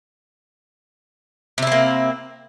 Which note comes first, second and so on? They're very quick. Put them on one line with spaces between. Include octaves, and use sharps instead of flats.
C3 E4 C4 A#3